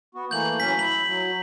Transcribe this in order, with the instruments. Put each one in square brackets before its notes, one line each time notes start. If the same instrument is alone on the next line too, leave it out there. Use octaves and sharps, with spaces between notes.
[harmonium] B3 F#4
[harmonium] E3 A3 A#3 [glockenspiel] G6 F#7
[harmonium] A2 F#3 C#4 [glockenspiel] B6
[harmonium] E4 [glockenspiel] F#7
[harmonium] F#3